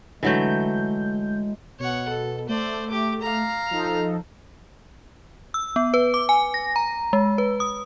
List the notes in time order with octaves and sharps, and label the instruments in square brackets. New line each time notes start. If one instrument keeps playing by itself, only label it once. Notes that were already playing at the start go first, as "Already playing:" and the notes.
[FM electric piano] D3 G6 [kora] E3 F#3 A3 [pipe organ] G#3
[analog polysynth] B2 [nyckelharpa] C#5 F#5
[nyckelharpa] A4
[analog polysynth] A3 [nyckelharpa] C5 D5
[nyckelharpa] G4 D6
F5 A#5
[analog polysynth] F3 D#4 A4
[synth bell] E6
B3
B4
D6
G#5
A#6
A#5
G#3
B4
D#6